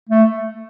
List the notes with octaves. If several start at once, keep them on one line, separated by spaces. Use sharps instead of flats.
A3